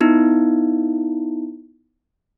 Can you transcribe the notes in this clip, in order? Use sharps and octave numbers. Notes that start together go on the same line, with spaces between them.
B3 D#4 E4